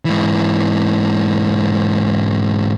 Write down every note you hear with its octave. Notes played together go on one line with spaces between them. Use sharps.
G#2 E3